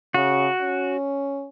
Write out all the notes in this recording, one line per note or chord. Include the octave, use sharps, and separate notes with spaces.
C#3 F#4
C#4